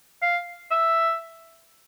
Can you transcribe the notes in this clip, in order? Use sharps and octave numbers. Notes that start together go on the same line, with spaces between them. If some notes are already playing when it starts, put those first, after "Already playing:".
F5
E5